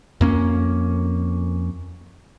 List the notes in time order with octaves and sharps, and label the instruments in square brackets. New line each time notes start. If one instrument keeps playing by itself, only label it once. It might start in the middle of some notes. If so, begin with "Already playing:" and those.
[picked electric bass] F2 A#3 C#4